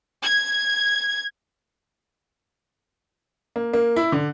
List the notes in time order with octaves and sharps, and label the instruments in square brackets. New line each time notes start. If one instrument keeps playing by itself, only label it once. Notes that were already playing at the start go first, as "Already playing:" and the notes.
[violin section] G#6
[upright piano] A#3
A#3
E4
D3